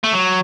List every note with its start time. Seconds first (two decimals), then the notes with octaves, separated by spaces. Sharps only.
0.04 A3
0.13 F#3